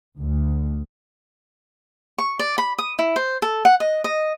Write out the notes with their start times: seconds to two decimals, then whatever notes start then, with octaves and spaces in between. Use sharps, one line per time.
0.19 D2
2.18 C#6
2.39 D5
2.58 B5
2.78 D#6
2.99 E4
3.16 C5
3.42 A4
3.65 F#5
3.80 D#5
4.04 D#5